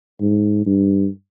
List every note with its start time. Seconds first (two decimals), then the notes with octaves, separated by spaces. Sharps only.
0.21 G#2
0.66 G2